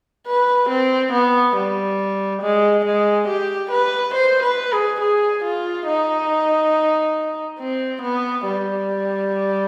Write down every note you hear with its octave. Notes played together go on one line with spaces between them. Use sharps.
B4
C4
B3
G3
G#3
G#3
G4
B4
C5
B4
G#4
G#4
F4
D#4
C4
B3
G3